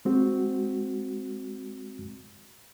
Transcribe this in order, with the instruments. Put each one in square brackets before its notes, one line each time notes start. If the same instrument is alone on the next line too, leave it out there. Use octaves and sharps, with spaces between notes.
[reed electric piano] G#3 C4 F#4